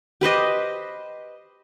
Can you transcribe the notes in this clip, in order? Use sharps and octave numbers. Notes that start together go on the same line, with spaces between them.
G4 B4 C5 D#5